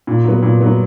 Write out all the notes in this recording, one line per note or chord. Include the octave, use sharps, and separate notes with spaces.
A#2
F#3 B3
A#2
F#3 B3